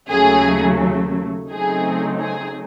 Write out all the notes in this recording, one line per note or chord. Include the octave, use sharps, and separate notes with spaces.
D#2 C#3 F#3 A3 G#4
C#3 F#3 A3 C4 D#4 G#4
G#4